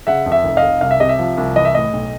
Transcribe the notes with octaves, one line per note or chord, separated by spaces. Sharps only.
C#3 E5 F#5
F2
E5
F1
D#5 F5
F1
C2 F5
E5
C3 D#5
E5
F3
C2
E3 D#5
E5
A2 D#5
B1